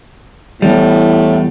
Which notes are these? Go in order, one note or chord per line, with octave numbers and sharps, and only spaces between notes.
E2 A2 G3